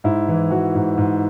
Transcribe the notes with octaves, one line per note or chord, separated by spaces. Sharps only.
G#2 E4
E3
E3 F#4
G#2
G#2